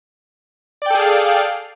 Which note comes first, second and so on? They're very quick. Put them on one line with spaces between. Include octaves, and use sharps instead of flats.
D5 G5 A4 G#4 F5